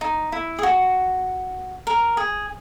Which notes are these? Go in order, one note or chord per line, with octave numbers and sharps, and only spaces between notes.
D#4
E4
G#4
F#4
A#4
G#4